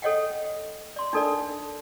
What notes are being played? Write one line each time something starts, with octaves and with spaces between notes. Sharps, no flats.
A4 C#5 D#5 F#5 G5
D5 C6
D4 D#4 A4 A#4 D5